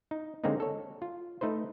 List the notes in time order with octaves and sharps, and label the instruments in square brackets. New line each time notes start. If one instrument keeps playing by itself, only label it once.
[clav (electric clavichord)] D#4
D3 G#3 A#3 C4 C#4 D#4
A4 C#5
F4
A3 D#4 B4 C5